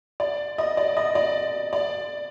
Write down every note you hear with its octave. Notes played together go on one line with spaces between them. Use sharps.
D5
D#5
D5
D#5
D5
D5